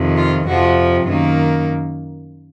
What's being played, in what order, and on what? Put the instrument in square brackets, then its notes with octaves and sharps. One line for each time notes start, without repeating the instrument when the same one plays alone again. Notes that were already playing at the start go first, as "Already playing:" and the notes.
Already playing: [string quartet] F2 C3 D#3
F4
F2 C3 F3 F#4
F#2 D#3 A#3 F4